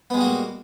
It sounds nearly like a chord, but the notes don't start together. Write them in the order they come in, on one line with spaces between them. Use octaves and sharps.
B3 G#3 G3 F#4 A#3